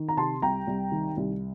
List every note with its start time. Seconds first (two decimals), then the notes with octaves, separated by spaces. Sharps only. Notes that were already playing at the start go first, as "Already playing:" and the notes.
Already playing: D#3
0.09 A#5
0.17 C3 A5 C6
0.42 C2 G5 A#5
0.67 C2
0.92 D#3
1.17 C2